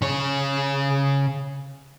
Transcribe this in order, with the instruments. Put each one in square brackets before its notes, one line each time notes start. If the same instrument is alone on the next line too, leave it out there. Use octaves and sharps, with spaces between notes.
[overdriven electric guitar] C#3 C#5